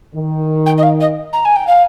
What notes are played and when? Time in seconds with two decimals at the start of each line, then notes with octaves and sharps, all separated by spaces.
0.15 D#3
0.66 G5
0.77 D#5
0.82 F5
1.00 D#5
1.33 A#5
1.45 G#5
1.56 G5
1.67 F5